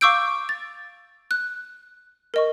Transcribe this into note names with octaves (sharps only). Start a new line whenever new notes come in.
F5 C#6 D6 E6 G6 D7
A6
F#6
A#4 D#5 C#6